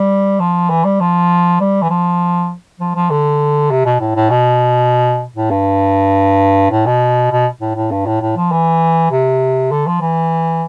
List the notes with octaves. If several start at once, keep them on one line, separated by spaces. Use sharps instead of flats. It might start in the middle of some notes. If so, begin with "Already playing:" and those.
Already playing: G3
F3
E3
G3
F3
G3
E3
F3
F3
F3
D3
C3
B2
A2
A2
B2
A2
G2
A2
B2
B2
A2
A2
G2
A2
A2
F3
E3
C3
D3
F3
E3